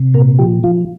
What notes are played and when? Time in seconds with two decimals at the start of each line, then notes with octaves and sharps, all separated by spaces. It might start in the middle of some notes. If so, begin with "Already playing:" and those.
Already playing: C3
0.14 A#2 A#4
0.39 F3 G4
0.63 F3 F4